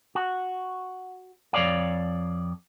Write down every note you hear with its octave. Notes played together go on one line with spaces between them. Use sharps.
F#4
F2 C#5 D5 F5